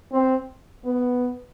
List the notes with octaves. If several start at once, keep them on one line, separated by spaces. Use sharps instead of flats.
C4
B3